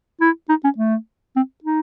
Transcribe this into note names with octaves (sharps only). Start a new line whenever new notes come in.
E4
D#4
C#4
A3
C4
D#4